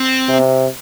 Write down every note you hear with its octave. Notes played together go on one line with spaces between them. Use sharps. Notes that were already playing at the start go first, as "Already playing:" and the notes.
Already playing: C4
C3